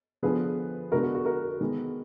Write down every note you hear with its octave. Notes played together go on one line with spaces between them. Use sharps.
D3 F3 B3 G#4 B4
D3 G#3 B3 F#4 A#4
F#4
F#4
F#4 A#4
D#3 G#3 B3